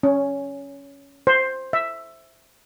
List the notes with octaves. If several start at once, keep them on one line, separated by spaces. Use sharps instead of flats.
C#4
C5
E5